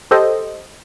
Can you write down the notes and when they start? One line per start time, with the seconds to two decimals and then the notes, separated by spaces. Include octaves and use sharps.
0.11 G4 A4 C5 D#5